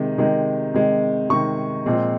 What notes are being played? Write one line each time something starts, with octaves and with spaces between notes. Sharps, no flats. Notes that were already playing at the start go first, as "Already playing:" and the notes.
Already playing: C3 D#3 G#3
C3 D#3 G#3
C3 D#3 G#3
C3 D#3 G#3 C#6
A#2 F3 G#3 C4